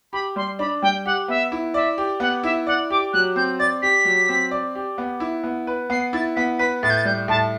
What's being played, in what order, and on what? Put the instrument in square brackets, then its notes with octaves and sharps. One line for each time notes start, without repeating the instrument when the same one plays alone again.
[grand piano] G4 [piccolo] B5
[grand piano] G3 [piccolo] C6
[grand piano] D4 [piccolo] B5
[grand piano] G3 [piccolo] G5
[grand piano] G4 [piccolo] F#5
[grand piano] B3 [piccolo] E5
[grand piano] E4
[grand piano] D5 [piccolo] E5
[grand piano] G4
[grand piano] B3 [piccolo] F#5
[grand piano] E4 [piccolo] E5
[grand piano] D5 [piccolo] F#5
[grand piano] G4 [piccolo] D6
[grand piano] F#3 [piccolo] F#6
[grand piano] C4 [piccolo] G6
[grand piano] D5 [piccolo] A6
[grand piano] G4 [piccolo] B6
[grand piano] F#3
C4
D5
G4
B3
E4
B3
B4
[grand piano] B3 [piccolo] C7
[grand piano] E4 [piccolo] A6
[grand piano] B3 [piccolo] B6
[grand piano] B4 [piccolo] B6
[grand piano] A2 [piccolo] A6
[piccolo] G6
A6
[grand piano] G3 [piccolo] G6
[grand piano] A2 [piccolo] A5